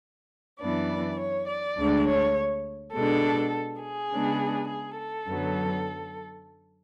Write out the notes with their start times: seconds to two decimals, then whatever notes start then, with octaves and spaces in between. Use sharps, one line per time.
0.60 F#2 E3 B3 D4 D5
1.19 C#5
1.48 D5
1.77 D2 D3 G#3 D4
2.07 C#5
2.93 B2 G#3 D4 A4
3.82 G#4
4.11 C#3 G#3 B3 D4
4.69 G#4
4.97 A4
5.27 F#2 D3 F#3 B3